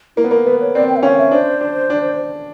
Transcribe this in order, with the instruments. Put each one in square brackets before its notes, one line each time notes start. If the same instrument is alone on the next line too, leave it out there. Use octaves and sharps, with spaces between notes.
[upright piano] A#3 [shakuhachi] E4
[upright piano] B3
[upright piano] A#3 [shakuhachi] A#4
[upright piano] B3 [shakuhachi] B4
[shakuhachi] C#5
[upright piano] C4 [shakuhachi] D5
[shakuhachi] G5
E5
[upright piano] C#4 [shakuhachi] F5
[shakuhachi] E5
[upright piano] D4 [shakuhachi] C5
[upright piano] D4
D4